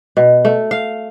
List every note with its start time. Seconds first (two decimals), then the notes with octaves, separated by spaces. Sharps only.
0.17 B2
0.45 A3
0.71 F5